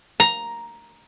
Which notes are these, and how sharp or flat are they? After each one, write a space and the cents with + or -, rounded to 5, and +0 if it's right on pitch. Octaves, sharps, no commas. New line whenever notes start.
A#5 +5